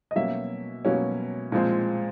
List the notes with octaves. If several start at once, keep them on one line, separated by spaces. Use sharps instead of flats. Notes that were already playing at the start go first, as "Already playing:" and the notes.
D#5
B2 F#3 A#3 C#4 E5
B2 F#3 A#3 C#4
A#2 F3 G#3 C4